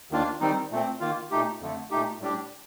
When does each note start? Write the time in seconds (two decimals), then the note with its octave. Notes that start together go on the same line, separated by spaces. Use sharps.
0.11 D#2 D#3 A#3 D4 F4
0.41 D#3 G3 C4 D#4
0.71 A#2 A3 C4
1.00 D#3 A#3 F4
1.31 A#2 A3 D#4 G4
1.60 F2 D3 A3
1.91 A#2 A3 D#4 G4
2.20 A2 G3 D4 G4